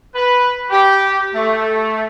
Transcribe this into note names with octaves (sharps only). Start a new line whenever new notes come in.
B4
G4
A3